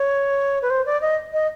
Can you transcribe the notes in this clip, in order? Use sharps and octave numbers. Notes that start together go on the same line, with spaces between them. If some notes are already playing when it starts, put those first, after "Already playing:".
Already playing: C#5
B4
C5
D5
D#5
D#5